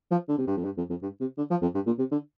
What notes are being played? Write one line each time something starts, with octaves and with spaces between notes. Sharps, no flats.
F3
D3
C3
G2
F2
G2
F2
F2
G2
C3
D3
F3
F2
G2
A#2
C3
D3